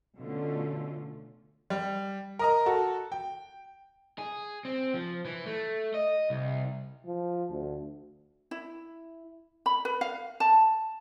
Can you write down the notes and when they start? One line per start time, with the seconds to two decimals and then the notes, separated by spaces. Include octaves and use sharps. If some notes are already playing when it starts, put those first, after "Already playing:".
0.18 B2 D3 A3 C#4 F4
1.70 G3
2.39 A#4 D#5 A#5
2.66 F#4 A4
3.12 G5
4.18 G#4
4.65 C4
4.94 F3
5.25 E3
5.46 A3
5.94 D#5
6.30 C2
7.06 F3
7.50 D2
8.51 E4
9.66 B5
9.85 B4
10.01 F5
10.40 A5